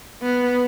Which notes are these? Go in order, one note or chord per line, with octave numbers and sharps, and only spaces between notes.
B3